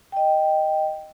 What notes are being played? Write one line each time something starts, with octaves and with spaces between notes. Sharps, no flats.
D#5 G5